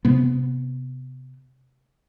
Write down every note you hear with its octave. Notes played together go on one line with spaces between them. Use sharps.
C3 B3